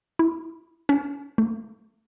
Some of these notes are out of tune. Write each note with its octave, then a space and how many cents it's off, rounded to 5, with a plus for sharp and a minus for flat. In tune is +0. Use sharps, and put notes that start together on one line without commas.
E4 +0
C#4 +40
A3 +30